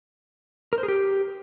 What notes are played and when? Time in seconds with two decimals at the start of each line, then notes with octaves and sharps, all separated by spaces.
0.73 A#4
0.78 C5
0.83 G#4
0.88 G4